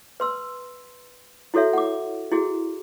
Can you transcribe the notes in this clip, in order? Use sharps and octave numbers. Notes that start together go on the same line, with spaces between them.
B4 C6 E6
E4 F#4 A4 C#5 E5
F#5 D6
E4 F#4 G#4